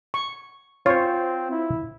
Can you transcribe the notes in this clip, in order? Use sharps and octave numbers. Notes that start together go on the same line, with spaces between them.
C#6
C4 F4 C5 C#5
E4